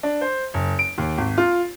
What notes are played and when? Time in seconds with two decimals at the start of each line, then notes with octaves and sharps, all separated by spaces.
0.03 D4
0.21 C5
0.54 F#1
0.79 D7
0.98 D#2
1.18 G#1
1.38 F4